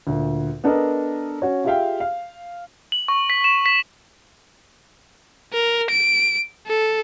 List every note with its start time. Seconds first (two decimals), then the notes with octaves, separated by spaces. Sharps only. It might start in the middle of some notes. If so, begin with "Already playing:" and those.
0.07 D2 A#2
0.64 B3 D4 A4 A#4 D#5
1.42 C#4 F#4 C#5
1.65 F4 G4 G#4 E5 F5 G5
2.00 F5
2.92 F#7
3.08 C#6
3.30 B6
3.44 E7
3.66 B6
5.53 A#4
5.91 D7
6.67 A4